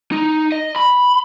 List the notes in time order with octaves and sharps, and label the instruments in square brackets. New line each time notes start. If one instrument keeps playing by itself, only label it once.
[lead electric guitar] D#4
D#5
B5